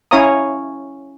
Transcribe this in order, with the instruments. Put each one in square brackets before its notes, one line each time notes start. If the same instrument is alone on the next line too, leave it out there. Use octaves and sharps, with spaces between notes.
[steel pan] C#4 E4 C#5 F5 A#5 D#6